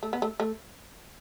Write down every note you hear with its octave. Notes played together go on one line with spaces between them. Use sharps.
A3
B3
A3
A3